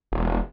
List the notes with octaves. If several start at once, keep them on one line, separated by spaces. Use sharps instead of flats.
E1